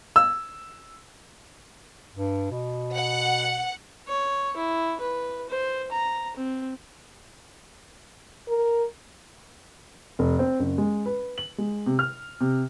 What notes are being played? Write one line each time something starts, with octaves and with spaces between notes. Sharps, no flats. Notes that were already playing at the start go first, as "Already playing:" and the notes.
E6
G2
B2
F#5
C#5
E4
B4
C5
A#5
C4
A#4
F1
C4
F#1
G#3
B4
F#7
G#3
C3
F6
C3